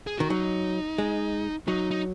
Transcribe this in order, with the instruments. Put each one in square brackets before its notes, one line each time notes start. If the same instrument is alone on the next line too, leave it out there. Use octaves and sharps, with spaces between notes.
[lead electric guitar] G#4
[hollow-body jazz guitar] D#3 [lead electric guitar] F#4
[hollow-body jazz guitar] F#3 [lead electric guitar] D#4
[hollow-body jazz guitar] G#3
[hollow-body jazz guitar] F#3 [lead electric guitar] D#4
[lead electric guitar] D#4